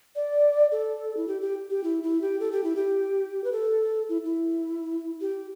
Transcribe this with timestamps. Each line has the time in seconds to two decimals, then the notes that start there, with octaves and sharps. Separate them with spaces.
0.16 D5
0.72 A4
1.17 E4
1.28 G4
1.41 G4
1.70 G4
1.84 E4
2.03 E4
2.22 G4
2.40 A4
2.52 G4
2.64 E4
2.76 G4
3.44 B4
3.52 A4
4.09 E4
4.25 E4
5.21 G4